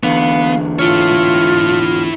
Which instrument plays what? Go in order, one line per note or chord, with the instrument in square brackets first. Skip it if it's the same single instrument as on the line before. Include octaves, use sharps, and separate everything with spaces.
[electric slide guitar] E2 D3 [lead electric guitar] B3 [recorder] F5
[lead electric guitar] E4 C#5 [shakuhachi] F4 [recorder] F6